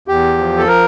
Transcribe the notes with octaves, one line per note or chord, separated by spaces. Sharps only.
E2 G4
F3
A4
A#4